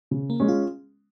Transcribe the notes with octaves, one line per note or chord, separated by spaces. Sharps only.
C#3
A#3
G#3 C#4
F4